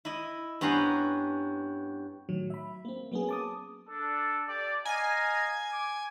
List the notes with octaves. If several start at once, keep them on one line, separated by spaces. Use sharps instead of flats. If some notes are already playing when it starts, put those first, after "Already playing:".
E4 D#5
G2 B3 C#4 A#5 C6
A2 D#3 F#3
E5 B5
A#3 C4
F#3 A#3 B3 C#4 G#4
A5 D6 D#6
D4 A4
G4 A4 D5
D#5 F5 G#5 A#5
D6